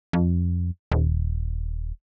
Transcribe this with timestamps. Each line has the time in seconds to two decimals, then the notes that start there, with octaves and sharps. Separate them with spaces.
0.13 F2
0.92 D#1